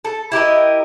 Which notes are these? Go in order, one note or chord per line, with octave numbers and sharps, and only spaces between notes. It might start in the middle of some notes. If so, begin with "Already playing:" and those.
A4
E4 G4 A#4 D#5